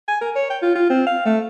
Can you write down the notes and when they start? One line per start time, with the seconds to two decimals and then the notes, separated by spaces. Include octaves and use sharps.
0.08 G#5
0.21 A#4
0.36 C#5
0.50 G5
0.62 F4
0.75 F4
0.90 C4
1.07 F5
1.26 A3